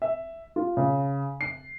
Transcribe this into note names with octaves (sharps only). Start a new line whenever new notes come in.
E5
F4
C#3
C7